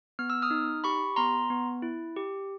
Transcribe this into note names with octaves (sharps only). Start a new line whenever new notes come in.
B3 F6
E6
D#6 F6
D#4
G4 B5 C#6
B3 A#5 C6
B3
E4
G4